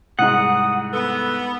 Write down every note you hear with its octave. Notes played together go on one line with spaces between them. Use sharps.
C2 G#2 F#5 D#6
B3 A4